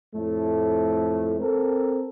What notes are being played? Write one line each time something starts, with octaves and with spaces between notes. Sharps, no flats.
F2 A2 A3
C4 A4 A#4